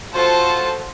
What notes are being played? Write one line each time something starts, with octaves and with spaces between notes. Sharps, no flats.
F4 F#4 A4 C5 A5